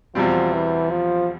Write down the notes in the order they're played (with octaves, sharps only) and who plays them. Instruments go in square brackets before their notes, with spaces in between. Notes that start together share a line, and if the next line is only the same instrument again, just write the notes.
[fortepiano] E2 B2 G3 C4 [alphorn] F3
[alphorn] E3
F3